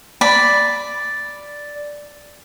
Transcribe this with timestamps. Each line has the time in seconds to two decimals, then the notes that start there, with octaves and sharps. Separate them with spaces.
0.21 D5 B5